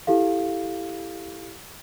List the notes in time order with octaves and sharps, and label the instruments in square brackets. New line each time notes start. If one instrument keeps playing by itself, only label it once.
[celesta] E4 G4 A4 F5